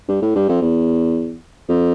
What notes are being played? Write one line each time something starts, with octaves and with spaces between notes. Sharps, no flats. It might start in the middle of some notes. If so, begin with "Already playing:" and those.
G2
A2
G2
F2
E2
F2